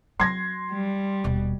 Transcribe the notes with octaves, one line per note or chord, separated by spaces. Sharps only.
F#3 C6 G#6 A#6
G3
D#1 B2